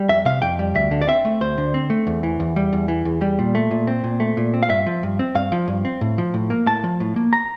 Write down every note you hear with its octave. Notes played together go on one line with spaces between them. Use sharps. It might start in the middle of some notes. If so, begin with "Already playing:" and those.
Already playing: G3
F2 E5
C3 F5
F2 G5
G3
D2 E5
D3
D5
C4 E5
A3
D2 C5
D3
C4
A3
E2
E3
E2
G3
E2
E3
E2
G3
A#2
A3
A#2
C4
A#2
A3
A#2
C4
F5
G2 E5
F3
G2
C4
G2 F5
F3
G2
C4
A2
F3
A2
A#3
A2 A5
F3
A2
A#3
A#5